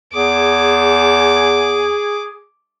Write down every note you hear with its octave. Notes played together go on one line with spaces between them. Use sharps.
E2 G#4 D6